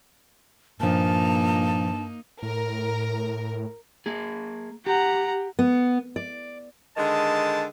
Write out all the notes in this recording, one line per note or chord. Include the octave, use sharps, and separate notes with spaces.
G2 A#2 F3 A#3 D#4 A5
A2 A#4
A#3 G#4
G4 F#5 A#5
B3
D5
D3 D#3 G#3 A5